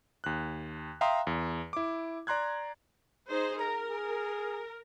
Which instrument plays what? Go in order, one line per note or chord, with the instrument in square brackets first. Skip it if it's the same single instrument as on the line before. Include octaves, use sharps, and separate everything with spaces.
[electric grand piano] D#2 F#6
E5 F5 G5 A#5 C6 D#6
E2
E4 D6
D5 A#5 C6 F#6 G#6
[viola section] D#4 G#4 C5
[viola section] A#4 [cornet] A#5
[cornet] G#4